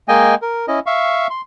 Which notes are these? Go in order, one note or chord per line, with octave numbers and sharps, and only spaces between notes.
G#3 A#3 D#5 G5 G#5
A#4
C#4 E4 D#5
E5 F5 C#6
C6